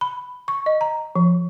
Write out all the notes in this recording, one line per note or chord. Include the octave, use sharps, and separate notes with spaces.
B5
C#6
D#5
A#5
F3